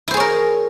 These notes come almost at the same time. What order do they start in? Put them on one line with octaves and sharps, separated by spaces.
E4 C5 G#4 C#5 A#4